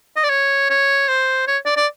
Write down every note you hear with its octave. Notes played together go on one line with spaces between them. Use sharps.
D#5
D5
C#5
C#5
C5
C#5
D5
D5